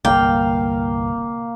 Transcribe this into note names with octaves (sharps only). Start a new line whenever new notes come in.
G1 C2 A#3 F5 G5